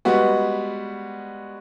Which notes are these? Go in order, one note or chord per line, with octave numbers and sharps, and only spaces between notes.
G3 G#3 B3 F#4